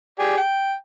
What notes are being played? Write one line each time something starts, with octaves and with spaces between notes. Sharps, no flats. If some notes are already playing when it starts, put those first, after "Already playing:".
G4 G#4 D5
G5